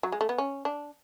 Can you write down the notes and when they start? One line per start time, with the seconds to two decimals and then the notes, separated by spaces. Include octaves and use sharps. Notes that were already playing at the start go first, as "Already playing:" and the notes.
0.03 F#3
0.12 G#3
0.21 A3
0.29 B3
0.38 C#4
0.65 D4